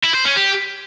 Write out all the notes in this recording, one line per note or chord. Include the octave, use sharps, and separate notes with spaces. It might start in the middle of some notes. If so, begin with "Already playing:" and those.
E4
C5
C#4
G4